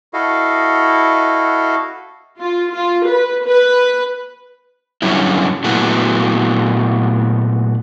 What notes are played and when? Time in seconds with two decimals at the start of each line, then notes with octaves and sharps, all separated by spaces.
0.13 E4 F#4 A4 D#5 F5
2.40 F4
2.72 F4
3.07 B4
3.45 B4
5.02 G2 D3 F#3 C#4 E4
5.64 A#2 F#3 A3 B3 E4 F#4